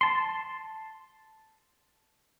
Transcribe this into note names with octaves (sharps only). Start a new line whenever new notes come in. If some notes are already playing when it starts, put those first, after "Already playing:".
A5 C6